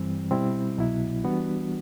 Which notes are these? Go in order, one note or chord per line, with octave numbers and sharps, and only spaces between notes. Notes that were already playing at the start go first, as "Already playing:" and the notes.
Already playing: G2 E3 G3 C4
B2 G3 C4 E4
C2 B2 F#3 B3 E4
E3 G3 B3 D4 F#4